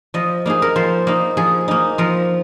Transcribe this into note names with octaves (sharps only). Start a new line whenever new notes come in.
F3 D#5
A#3 D#4 G#4
A#4
F3 C5
A#3 D#4
F3 G#4
A#3 D#4
F3 A#4